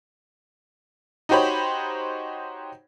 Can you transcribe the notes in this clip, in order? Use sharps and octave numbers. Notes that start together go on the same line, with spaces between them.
D#4 F#4 G4 C5 C#5 B5